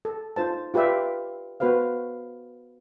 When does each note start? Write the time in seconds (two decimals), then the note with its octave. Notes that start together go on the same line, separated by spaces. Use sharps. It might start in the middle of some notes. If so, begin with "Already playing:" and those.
0.05 A4
0.36 D#4 F4 C5 A5
0.74 F4 G4 B4 D5 E5 F5
1.60 B3 F#4 B4 C5 F5